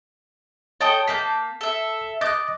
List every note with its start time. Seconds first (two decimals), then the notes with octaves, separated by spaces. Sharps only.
0.81 A4 C#5 D#5 G5 G#5 D#6
1.08 A#3 A5 G6 B6
1.61 A4 E5
2.21 D#5 D6 F#6 G6 A6